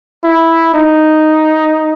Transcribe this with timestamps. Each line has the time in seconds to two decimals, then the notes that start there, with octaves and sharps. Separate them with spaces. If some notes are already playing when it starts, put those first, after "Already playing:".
0.24 E4
0.74 D#4